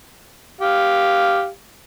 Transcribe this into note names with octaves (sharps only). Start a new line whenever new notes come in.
G4 F5